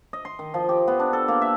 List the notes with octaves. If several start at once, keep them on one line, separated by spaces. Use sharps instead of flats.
D#5
C6
D#3
F3
G4
B3
D4
A4
A#3
E5